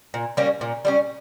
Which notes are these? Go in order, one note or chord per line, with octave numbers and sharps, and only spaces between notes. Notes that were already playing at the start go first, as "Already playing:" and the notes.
A#2
G3 A#3 C#4
A#2
G3 A#3 C#4